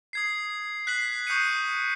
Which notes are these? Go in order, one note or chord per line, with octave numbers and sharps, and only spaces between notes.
D#6 G#6 C7
F#6 B6 C7 F#7
C#6 D#6 G6 C7 C#7 D#7